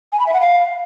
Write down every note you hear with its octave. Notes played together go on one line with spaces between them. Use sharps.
G#5
B5
E5
F#5
F5